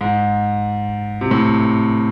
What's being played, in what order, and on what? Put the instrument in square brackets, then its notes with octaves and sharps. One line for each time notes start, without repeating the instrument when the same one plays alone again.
[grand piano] G#2
C3
A2